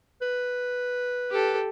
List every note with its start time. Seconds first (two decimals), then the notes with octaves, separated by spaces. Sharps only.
0.21 B4
1.31 G4 A4